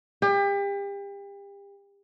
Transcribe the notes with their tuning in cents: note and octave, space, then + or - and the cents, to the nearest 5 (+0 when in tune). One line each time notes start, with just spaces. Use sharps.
G4 +35